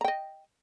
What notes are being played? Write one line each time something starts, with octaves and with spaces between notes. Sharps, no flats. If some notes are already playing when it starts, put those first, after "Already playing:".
D#5 G5 A#5